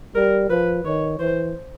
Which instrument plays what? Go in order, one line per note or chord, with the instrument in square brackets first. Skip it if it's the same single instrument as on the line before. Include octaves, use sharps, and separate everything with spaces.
[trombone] G3 [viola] A#4
[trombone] F3 [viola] B4
[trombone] D#3 [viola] C#5
[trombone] E3 [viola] C5